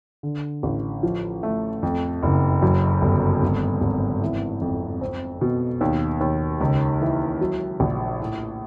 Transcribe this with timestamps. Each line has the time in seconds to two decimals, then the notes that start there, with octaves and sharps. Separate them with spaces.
0.23 D3
0.63 A1
1.03 F3
1.43 A3
1.83 F2
2.23 F#1
2.62 F#2
3.02 G1
3.42 G#1
3.81 G#1
4.22 E3
4.61 F2
5.01 C4
5.41 B2
5.81 D#2
6.21 D#2
6.61 C#2
7.01 E3
7.41 F#3
7.80 A#1
8.20 A2